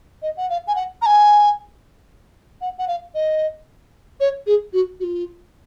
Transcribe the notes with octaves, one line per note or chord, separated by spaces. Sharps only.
D#5
F#5
F5
G#5
F#5
A#5
G#5
F#5
F#5
F5
D#5
C#5
G#4
F#4
F#4
F4